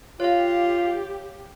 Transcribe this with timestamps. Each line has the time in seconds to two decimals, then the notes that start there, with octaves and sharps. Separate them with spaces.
0.20 F4 G4 C#5 F5